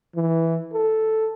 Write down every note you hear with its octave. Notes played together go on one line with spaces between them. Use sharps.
E3
A4